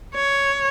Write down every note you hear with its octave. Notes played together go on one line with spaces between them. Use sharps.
C#5